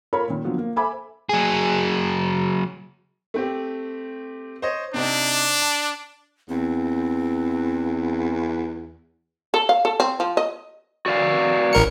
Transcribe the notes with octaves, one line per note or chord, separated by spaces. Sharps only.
F4 A4 A#4 C#5 B5
A#2 D#3
D3 F3 F#3 B3 F4
A#3
A4 C5 E5 G#5 B5 D6
F#3 G#4
A3 C4 G4
C5 C#5 D#5
C3 C4 D4 D#4
A5
E2 C4
A4
F5
A4
C4
F3
D#5
F#4 D5 F5
A1 A#4 C#7